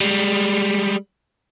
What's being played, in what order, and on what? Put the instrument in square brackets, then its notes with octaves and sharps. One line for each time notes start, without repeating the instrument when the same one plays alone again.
[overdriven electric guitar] G3 G#3